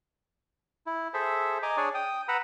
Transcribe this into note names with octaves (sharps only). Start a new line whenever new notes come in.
E4
G#4 A4 C5 E5
D#5 G#5 A#5 D6
D4 G#4 C#5 D5 G#5
G5 D#6
B4 F#5 A#5 B5 E6